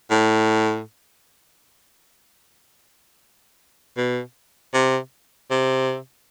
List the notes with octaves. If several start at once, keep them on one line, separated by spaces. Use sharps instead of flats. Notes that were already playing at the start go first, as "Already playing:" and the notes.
A2
B2
C3
C3